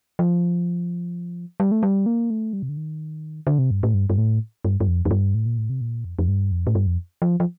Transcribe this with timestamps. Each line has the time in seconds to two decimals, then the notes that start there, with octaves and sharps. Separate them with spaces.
0.19 F3
1.60 G3
1.72 A3
1.83 G3
2.06 A#3
2.30 A3
2.53 G3
2.63 C3
2.69 D3
2.77 D#3
3.47 D3
3.58 C3
3.71 G2
3.83 A2
3.94 G2
4.10 G2
4.18 A2
4.65 G2
4.80 G2
4.88 F2
5.05 F2
5.11 G2
5.35 A2
5.46 A#2
5.58 A2
5.70 C3
5.81 A#2
6.05 F2
6.19 F2
6.28 G2
6.52 F2
6.67 A2
6.75 G2
6.87 F2
7.22 F3
7.40 F3